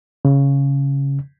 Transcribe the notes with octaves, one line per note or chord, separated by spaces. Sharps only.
C#3